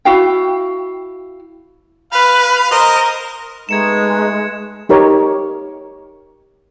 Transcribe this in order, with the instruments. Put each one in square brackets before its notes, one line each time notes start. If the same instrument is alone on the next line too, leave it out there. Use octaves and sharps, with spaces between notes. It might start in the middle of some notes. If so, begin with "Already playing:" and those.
[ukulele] E4 F#4 F5 G5
[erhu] B4 [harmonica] F5
[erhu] A#4 [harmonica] C5 D#5
[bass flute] G#3 [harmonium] A3 B3 D#4 [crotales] G#6 C#7 E7
[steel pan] D#4 G4 A#4 C#5